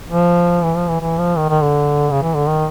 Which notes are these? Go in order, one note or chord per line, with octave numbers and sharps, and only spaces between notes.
F3
E3
F3
E3
E3
F3
D#3
D#3
D3
C#3
E3
D3
D#3